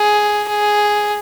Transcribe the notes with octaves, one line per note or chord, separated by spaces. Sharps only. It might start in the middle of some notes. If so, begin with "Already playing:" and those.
Already playing: G#4
G#4